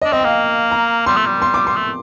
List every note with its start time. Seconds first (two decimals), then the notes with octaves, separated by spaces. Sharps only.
0.02 D#5
0.05 D4
0.12 C4 D#5
0.20 G5
0.24 A#3 F5
0.71 A#5
1.06 G3 C6
1.16 A3
1.26 G3
1.42 C6
1.54 D6
1.67 C6
1.76 A3